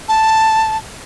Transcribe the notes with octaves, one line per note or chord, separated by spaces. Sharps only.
A5